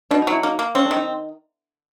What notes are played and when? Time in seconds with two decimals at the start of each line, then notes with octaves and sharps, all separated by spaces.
0.11 B2 D4
0.22 D#4
0.27 F#3 E4
0.43 A#3 D#4
0.59 A#3
0.75 C4 C#4
0.85 D4
0.91 D#3
0.97 D#4